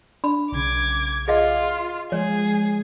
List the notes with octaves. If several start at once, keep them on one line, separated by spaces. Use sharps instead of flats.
D4 B5
B1 C#3 D6 G#6
F4 G#4 D#5 F5
F3 G#3 G#4 C#5